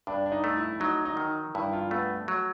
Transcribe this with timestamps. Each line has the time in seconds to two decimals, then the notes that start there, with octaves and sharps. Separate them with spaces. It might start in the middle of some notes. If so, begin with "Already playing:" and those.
0.07 G2 D4
0.26 D4
0.32 D#4
0.44 A3
0.57 E4
0.80 F#3 D#4
1.05 D#4
1.17 D#3
1.55 G2 E4
1.73 F4
1.91 A3 B3
2.28 F#3